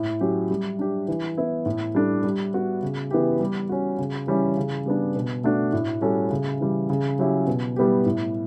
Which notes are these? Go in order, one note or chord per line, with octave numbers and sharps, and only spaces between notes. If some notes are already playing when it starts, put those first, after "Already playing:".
Already playing: A2
F#3 C#4 G4
G3
D4 G4
E3
B3 E4
A2
G3 D4 A4
G3
B3 F#4
C#3
E3 B3 E4 G4
G3
C#4 F#4
C#3
E3 G3 C#4 E4
C#3
G3 B3 D4
B2
A3 D4 F#4
A2
G3 C#4 F#4 A4
C#3
E3 G3
C#3
F#3 C#4 E4 G4
B2
G3 B3 E4 G4
A2